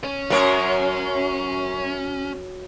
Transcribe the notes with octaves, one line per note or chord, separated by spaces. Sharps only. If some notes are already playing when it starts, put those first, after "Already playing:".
C#4
F#2 F#3 A#4 C#5